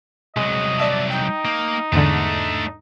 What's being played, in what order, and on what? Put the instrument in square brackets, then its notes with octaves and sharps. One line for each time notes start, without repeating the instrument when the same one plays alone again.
[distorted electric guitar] C2 F#3 [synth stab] G#3 [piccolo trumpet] D#5
[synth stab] D5 E5 A5
[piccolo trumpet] D#4 [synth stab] G5
[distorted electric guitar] A#3
[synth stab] E2 G#2 D3 [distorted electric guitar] A3 D4